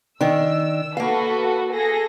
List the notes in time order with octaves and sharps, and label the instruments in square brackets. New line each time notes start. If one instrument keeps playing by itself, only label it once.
[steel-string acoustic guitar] D#3 D4 [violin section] E6
[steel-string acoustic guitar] A#3 F5 [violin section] F#4 A4 B4
[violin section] G#4 A4 A#6